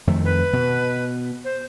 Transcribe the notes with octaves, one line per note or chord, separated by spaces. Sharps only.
F2 D#3 A3
B4
B2
C5